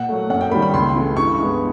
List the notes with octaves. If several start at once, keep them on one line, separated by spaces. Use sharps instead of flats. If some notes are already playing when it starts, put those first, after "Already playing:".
Already playing: A#2 F#5
F#3 A3
F#2 F#5
G5
D#3 G3 A#3 B5
B5
C#2 C6
C#3 E3 A3
G2 C#6
E3 G#3 B3